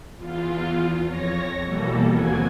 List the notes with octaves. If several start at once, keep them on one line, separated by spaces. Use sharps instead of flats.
E2 F4
F2 C#5 A#6
B2 E3 G3 A#3 A4
D#2 F3 C4 F#4 G#5 G#6